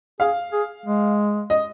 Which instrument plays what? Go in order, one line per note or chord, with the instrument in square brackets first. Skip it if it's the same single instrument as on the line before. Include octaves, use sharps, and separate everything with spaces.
[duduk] G#4 [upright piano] F5
[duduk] G#4
G#3
[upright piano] D#5